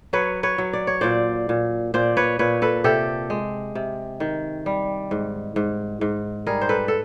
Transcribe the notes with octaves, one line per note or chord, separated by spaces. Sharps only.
F#3 B4 C#5
B4 C#5
F#3
D5
C#5
A#2 C5 D5
A#2
A#2 C5 D5
B4 C#5
A#2 B4 C#5
A4 B4
C3 G4 A4
G#3
C3
D#3
G3
G#2
G#2
G#2
G3 G#4 A#4
C5
A4 B4
A4